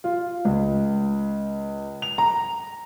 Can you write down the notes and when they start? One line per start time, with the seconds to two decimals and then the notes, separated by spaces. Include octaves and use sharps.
0.04 F4
0.45 C#2
2.02 F7
2.18 A#5